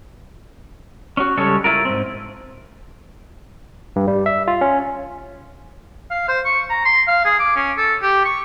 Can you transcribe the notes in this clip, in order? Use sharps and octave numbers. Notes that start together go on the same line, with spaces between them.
C#4 F#4
C#3 G3 G#3 C#4 A4 C#5
E4 F4 A#4
G#2 C4
G2
G3
E5
F4
C#4
F5
C5
C#6
A#5
C6
F5
G#4
D6
C#4
A4
G4
C#6